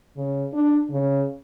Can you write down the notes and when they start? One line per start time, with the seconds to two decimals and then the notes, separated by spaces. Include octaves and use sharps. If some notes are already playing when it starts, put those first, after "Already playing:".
0.16 C#3
0.53 D4
0.91 C#3